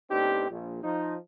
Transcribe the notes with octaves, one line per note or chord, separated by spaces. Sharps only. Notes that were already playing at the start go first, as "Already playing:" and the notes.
A2 B3 C4 D4 D#4 G4
A#1
F3 D#4